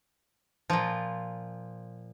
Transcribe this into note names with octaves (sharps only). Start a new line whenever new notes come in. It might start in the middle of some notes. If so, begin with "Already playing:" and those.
A#2 F3